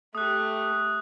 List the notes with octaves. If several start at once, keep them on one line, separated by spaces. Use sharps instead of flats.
A3 G4 D#6 F#6